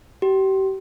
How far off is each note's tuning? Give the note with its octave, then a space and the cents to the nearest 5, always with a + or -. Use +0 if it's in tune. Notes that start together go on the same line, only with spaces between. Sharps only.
G4 -35